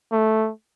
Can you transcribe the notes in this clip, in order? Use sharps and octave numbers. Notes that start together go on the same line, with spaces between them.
A3